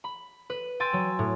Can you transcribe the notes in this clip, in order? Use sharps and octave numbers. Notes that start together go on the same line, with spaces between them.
B5
B4
G5 G#5 C6 E6 A6 D#7
F#3
A2